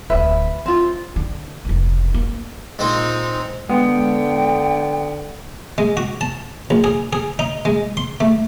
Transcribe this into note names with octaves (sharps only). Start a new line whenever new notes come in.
D1 D2 B4 E5
G#3 C4 F4
D3
F1 C#2
A#3
A#2 G#3 C4 D#4
D3 G#3 B3 G5
G#3
F#4
A5
A#1
G#4
G#4
D#4
G#3
C6
A3